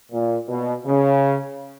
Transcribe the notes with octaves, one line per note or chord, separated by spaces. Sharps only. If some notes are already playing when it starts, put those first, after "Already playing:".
A#2
B2
C#3